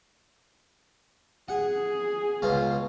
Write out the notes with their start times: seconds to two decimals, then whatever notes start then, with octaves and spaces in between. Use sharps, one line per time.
1.49 G#4 F#5
2.42 C#2 B2 F4